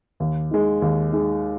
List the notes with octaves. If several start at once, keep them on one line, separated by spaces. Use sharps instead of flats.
D#2
D#3 G#3
D#2
D#3 G#3